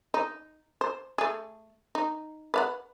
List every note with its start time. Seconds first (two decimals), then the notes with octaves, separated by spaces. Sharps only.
0.14 D#4
0.81 C5
1.18 A3 G#4
1.95 D#4
2.54 B4 F5 F#5